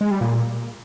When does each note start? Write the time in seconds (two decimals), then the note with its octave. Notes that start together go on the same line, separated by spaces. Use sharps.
0.01 G#3
0.11 G3
0.21 A#2